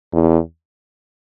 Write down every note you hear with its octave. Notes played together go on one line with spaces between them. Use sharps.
E2